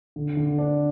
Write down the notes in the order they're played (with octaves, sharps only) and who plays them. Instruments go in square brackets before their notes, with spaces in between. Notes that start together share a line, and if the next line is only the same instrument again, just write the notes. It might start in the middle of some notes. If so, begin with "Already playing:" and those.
[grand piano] D3
D3
D4